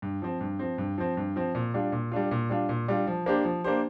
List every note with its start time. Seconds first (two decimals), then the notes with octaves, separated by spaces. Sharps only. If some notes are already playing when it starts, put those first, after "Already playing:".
0.02 G2
0.22 F3 C4
0.41 G2
0.59 F3 C4
0.78 G2
0.98 F3 C4
1.17 G2
1.36 F3 C4
1.55 A#2
1.74 G3 D4 F4
1.92 A#2
2.12 G3 D4 F4
2.31 A#2
2.50 G3 D4 F4
2.69 A#2
2.88 G3 D4 F4
3.07 F3
3.26 A#3 D4 G4 C5
3.45 F3
3.64 A#3 D4 G4 C5